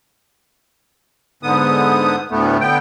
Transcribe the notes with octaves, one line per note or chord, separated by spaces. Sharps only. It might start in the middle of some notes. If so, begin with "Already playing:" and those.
G#2 D3 B3 D#6
D2 A2 A3 B3
D3 B3 G5